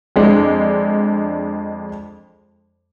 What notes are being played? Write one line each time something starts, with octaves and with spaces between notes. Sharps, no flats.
F2 G#3 D4